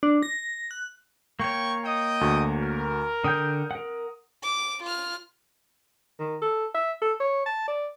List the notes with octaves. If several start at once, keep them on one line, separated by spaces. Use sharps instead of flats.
D4
A#6
F#6
A#3 C#5 G5 C#6
D#5 G5 D#6
D2 F#4 C#6
A#4
D3 G5 D#6 G6
A#4 F#5
D6
F4 F6
D#3
A4
E5
A4
C#5
A5
D5